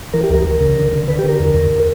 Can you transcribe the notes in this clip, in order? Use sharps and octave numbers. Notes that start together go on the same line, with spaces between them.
E3 A#4
G4
D2 A#4
D2
C#3
D3
D3
D3 B4
G4
D3 A#4
E2
E2